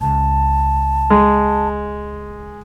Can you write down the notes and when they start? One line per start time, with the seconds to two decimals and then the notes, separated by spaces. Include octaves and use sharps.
0.01 C#2 A5
1.10 G#3